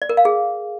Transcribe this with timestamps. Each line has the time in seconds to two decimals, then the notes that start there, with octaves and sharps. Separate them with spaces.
0.02 D5
0.09 A#4
0.17 F5
0.25 G#4